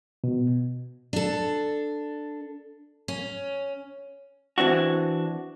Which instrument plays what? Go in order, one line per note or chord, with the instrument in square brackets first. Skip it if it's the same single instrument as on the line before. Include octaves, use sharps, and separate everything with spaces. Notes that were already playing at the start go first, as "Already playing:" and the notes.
[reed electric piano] B2
[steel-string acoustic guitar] D4 A4
C#4
[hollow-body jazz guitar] E3 C4 D4 F#4